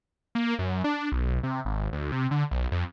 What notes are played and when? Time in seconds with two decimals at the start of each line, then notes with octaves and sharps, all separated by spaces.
0.35 A#3
0.59 F#2
0.84 D4
1.12 B1
1.43 C3
1.65 G#1
1.93 D2
2.12 C3
2.31 D3
2.51 B1
2.72 F2